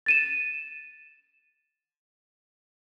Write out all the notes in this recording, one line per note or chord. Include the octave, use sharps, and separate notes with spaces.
A6 D#7 E7